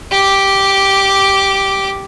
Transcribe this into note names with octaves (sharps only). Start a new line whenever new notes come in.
G4 D6